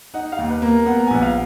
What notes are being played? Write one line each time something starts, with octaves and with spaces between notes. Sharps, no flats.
D#4 F#5
F5
D#2
B4
A#3
B3 F#5
A#5
G#5
A#1 F#5
F5